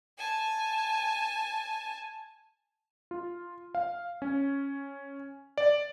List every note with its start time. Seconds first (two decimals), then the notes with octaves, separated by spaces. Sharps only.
0.18 G#5 A5
3.11 F4
3.75 F5
4.22 C#4
5.58 D5